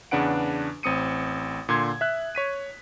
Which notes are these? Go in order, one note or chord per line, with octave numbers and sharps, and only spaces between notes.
E2 C#3 D4 B4 F#5 D7
A1 C4 D#6 C#7 D#7
A#2 D3 C6 G#6
E5 F#6
C#5 B6 D#7